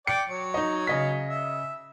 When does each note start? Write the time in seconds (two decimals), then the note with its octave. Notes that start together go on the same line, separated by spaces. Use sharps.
0.07 D5 G5 C#7
0.29 F#3 C#5
0.54 D#4 D#5
0.87 C#3 D#5 B6
1.27 E5